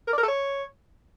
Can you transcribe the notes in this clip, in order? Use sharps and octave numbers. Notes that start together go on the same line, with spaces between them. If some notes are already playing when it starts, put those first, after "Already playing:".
A#4
D5
A#4
A4
C#5